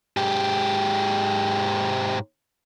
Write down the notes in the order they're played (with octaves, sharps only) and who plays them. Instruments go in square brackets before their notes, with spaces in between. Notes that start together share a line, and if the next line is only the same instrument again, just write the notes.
[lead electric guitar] G#2 G4